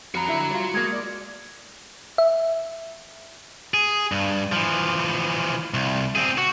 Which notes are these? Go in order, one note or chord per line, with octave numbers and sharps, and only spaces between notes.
F2 F#4 A#5 B5
D3 E4 E5
G3 F4
G#3 A#3 G#6
D5
E5
G#4
G2
E3 F3
C2
C4 G#4
F#4